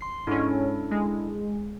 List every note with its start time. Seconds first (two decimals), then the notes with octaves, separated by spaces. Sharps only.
0.01 C6 C7
0.27 G#2 C#4 D4 E4 A4
0.91 G#3